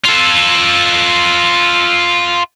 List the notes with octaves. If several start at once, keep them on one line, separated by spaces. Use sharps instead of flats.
F4 A4